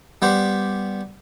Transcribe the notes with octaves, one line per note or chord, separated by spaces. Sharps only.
G3 B3 C5